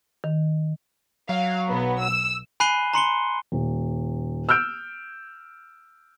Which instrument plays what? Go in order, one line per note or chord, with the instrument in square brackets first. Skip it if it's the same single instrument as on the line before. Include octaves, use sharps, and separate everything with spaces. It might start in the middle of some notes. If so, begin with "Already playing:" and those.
[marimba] D#3
[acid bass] F#3 [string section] F5
[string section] B1 B3
E6
[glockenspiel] G#5 B5 F#6 C7 D#7 G7
A#5 C6 C#7 G7
[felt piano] D#1
E6 F6 G6 D7